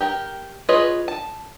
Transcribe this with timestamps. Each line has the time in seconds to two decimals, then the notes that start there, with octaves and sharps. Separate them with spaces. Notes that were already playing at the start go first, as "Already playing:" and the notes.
0.01 G4 A#4 G5
0.69 F4 G#4 B4 C#5 D#5
1.08 A5